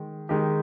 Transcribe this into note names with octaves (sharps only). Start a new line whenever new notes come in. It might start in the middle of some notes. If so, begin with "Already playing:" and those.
Already playing: D#3 G#3
D#3 G#3 D#4 G4